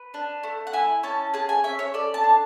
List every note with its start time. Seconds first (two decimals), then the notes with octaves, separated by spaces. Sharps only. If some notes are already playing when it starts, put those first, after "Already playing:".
Already playing: B4
0.14 D4
0.43 A3
0.67 F#5
0.73 E4 G#5
1.03 C#4 A5
1.34 G#4 A5
1.49 G#5
1.64 C#4 E5
1.79 C#5
1.94 A4 D5
2.14 A5
2.24 D4